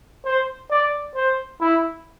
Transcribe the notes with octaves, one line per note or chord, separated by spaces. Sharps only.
C5
D5
C5
E4